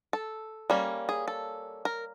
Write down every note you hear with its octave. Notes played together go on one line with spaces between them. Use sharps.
A4
G3 A#3 C#4
G#4
A4
A#4